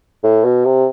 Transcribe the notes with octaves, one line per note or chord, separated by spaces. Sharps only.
A2
B2
C3